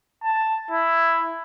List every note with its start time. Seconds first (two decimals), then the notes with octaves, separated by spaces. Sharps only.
0.24 A5
0.71 E4